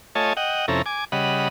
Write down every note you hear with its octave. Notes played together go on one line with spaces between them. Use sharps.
A3 F4 C#5 D#5 G#5 A5
D#5 F#5 G5
F2 C3 C#4 E4 A4 A#5
G#5 D6
C#3 G3 D#5 F#5 B5